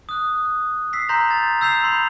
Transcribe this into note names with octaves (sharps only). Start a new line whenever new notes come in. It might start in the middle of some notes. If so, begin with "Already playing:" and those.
D#6 F#6
E6 B6 C7
A#5 C6 G6 A#6 B6 F7
A6
E6 G6 C7 E7 F7
B5 C6 C7